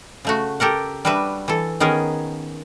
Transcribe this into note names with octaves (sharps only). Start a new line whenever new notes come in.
C#3 A3 F#4
G4 A4 A#4 F#5
G3 D4 F#4 B4 E5
E3 A4
D#3 B3 C#4 G#4 A#4